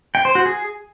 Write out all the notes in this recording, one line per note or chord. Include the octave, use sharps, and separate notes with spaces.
G5
C5
F#4
G#4